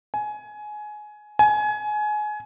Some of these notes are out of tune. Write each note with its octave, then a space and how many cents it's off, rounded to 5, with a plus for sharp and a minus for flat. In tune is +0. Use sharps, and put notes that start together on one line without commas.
G#5 +20
G#5 +25